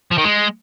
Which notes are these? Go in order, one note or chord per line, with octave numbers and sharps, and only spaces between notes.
F3
D#3
G#3